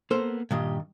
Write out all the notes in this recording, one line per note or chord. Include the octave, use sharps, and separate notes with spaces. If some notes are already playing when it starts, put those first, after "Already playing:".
A#3 B3 A4 A#4 C5
G2 A#2 D#3 G4 D#5